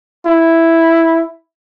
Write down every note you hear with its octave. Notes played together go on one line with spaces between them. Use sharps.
E4